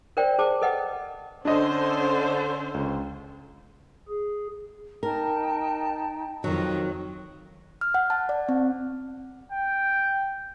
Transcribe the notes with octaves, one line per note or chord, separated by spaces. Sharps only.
A#4 C5 D5 G5
G#4 C5 A5 D6
A4 B4 D#5 F#5 G5
D3 C#4 D4 C5 D#5
C#2
G#4
D#4 A#4 G5 A5
F2 D#3 F#3
F6
F#5
A5
D5
C4
G5